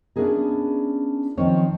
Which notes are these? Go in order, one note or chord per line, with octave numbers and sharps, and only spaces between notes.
B3 C#4 D4 E4 G#4 A#4
D#3 F3 C4 D#4 C5 C#5